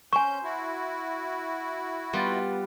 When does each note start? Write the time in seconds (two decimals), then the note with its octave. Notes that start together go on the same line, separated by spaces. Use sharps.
0.13 C#4 C5 G#5 C#6 G6
0.43 E4 F#4
2.13 G3 B3 F4